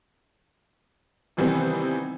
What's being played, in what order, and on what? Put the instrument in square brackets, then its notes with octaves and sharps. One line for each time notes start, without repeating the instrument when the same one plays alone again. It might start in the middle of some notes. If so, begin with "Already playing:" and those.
[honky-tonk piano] C3 D#3 E3 G3 B3 C4